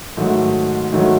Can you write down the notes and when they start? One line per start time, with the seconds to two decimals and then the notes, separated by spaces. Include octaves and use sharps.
0.17 G#2 D#3 F#3 A3
0.92 G#2 D#3 F#3 A3